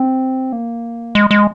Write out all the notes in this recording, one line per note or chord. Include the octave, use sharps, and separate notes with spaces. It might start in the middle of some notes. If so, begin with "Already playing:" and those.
Already playing: C4
A#3
G#3
G#3